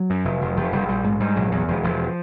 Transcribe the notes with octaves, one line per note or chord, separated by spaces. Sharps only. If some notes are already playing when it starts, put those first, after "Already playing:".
Already playing: F#3
F#2
F1
F1
F1 F3
F1 G3
A#1 G3
G#2 G#3
G#2 G3
A#1 F#3
E2 F#3
E1 F3
E1 F3